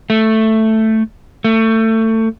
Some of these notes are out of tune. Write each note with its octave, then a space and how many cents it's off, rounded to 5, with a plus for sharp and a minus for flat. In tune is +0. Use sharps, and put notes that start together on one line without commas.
A3 +5
A3 +25